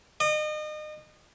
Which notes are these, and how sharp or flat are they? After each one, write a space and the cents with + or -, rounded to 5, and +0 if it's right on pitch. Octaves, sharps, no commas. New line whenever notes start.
D#5 -35